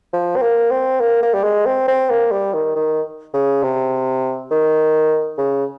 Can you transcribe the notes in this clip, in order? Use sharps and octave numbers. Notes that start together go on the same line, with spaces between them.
F3
C4
A#3
C4
A#3
A#3
G3
G#3
C4
C4
A#3
G3
D#3
D#3
C#3
C3
D#3
C#3